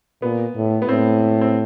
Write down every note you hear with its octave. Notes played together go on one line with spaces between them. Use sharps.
A#2 B3
A2
B3
A2 C4
C4